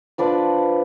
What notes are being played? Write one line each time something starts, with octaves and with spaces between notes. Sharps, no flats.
F3 D4 B4 D6